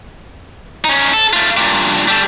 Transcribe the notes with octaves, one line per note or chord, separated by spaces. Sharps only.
C#4 D#4
A4
A3 F4
G2 A#2
G3 A4